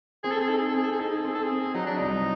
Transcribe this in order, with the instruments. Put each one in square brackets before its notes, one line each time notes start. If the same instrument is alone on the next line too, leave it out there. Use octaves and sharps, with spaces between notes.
[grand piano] C4 [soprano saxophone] G#4
[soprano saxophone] A4
G#4
[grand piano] D#4 [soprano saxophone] A4
[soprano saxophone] G#4
A4
[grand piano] C4 [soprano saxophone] G#4
[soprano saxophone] A4
G#4
[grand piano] D#4 [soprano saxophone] A4
[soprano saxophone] G#4
A4
[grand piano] C4 [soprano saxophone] G#4
[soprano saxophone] A4
G#4
[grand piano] C4
[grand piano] F#3 [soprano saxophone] D#4
[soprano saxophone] D4
[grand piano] C2 [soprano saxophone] D#4